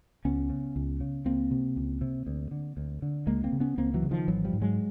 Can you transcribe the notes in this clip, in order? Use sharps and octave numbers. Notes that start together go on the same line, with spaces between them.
C#2 B3 C#4
C#3
C#2
C#3
C#2 A#3 C4
C3
C#2
C3
D2
D3
D2
D3
C#2 G#3 A#3
A#3 C4
C#3
B3 C#4
C#2 A#3 C4
E3 F#3
C#3
D#3 F3
G#1 E3 F#3
F3 G3
G#2
F#3 G#3